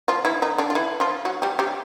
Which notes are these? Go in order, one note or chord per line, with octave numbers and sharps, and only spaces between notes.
F3 F4
E3 E4
D#3 D#4
D3 D4
F4
E3 E4
F3 F4
F#3 F#4
G3 G4
G3 G4